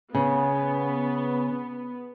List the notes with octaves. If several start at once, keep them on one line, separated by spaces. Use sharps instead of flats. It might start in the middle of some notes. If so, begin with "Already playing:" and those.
C#3 B3